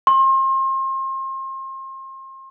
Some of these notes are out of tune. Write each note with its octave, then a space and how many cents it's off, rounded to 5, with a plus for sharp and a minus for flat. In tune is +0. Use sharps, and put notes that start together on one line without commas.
C6 +35